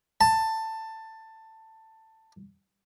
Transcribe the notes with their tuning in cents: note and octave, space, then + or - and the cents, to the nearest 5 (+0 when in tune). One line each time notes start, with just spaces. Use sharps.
A5 +15